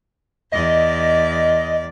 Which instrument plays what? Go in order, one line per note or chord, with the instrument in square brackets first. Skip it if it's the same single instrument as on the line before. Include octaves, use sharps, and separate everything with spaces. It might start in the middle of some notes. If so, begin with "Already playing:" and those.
[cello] E2 D5 [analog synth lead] D#5